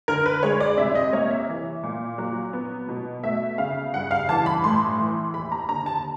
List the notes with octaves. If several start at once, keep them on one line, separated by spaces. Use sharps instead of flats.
D3 A#4
B4
G#3 C#5
D5
C3 E5
D#5
A#3 C#5
E5
E3
A#2
F#3
B3
B2
A3 E5
C#3 F5
G2 F#5
F5
E3 A5
B5
A2 C6
E3
D#2 B5
A#5
D3 A#5
A5